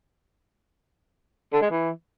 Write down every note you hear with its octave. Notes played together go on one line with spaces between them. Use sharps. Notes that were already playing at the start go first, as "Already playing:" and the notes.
D3
G#3
E3